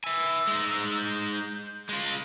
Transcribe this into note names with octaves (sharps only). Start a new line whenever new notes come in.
E5 G#5 E6
G#3 D#4
G6
G#3 F4